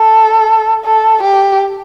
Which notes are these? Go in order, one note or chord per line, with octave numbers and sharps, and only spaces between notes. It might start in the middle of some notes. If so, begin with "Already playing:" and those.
Already playing: A4
A4
G4